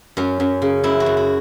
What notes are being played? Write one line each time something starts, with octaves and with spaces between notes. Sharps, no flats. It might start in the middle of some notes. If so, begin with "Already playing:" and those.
F#2 C#4
F#2
C#3
F#2 E4
F#4
F#2
F#4